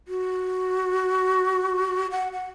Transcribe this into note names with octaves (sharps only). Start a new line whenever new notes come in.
F#4
F#5
F#5